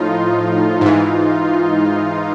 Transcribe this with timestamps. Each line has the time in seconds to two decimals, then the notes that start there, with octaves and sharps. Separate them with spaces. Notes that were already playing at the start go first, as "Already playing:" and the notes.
Already playing: A2 F3 D#4 F4
0.81 G#2 E3